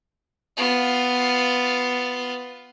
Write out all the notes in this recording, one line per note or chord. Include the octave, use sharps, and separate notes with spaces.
B3 F4